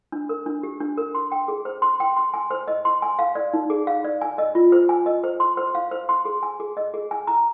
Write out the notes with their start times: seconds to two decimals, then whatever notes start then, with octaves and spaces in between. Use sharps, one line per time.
0.12 D4
0.29 A#4
0.46 D4
0.63 G4
0.80 D4
0.97 A#4
1.15 C6
1.32 G5
1.48 G#4
1.65 C5
1.82 C6
2.00 G5
2.17 C6
2.34 G#5
2.51 C5
2.68 D#5
2.85 C6
3.02 G#5
3.19 F5
3.35 D5
3.54 D#4
3.70 G#4
3.87 F5
4.04 D5
4.21 G#5
4.38 D#5
4.55 F4
4.72 C5
4.89 G#5
5.06 D#5
5.24 C5
5.40 C6
5.57 C5
5.75 F5
5.91 C5
6.09 C6
6.25 G#4
6.43 G#5
6.60 G#4
6.77 D#5
6.94 G#4
7.11 G#5
7.27 A#5